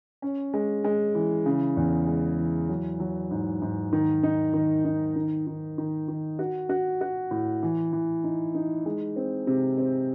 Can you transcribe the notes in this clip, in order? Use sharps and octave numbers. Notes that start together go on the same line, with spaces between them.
C#4
G#3
G#3
E3
C#3
E2
G#3
E3
F#3
F#3
G#2
G#2
D#3
D#4
D#3
D#4
D#3
D#3
D#3
D#3
F#4
F#4
F#4
A2
E3
E3
D#4
D#4
G#3
C4
C3
C4